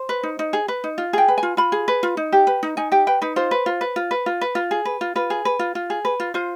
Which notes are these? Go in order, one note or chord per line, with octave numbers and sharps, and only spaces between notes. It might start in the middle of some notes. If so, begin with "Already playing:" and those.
Already playing: C5
B4
D#4
D#4
G#4
B4
D#4
F4
G#4 G5
B4
G#5
F4
F4 B5
G#4
B4
F4
D#4
G4
B4
D#4
D#4 G#5
G4 G5
B4 G5
D#4 B4
F4 C5
B4
F4
B4
F4
B4
F4
B4
F4
G#4
B4
F4
F4 B4
G#4
B4
F4
F4
G#4
B4
F4
F4 C5